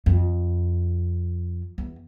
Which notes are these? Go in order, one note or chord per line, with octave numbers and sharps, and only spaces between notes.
F2
E2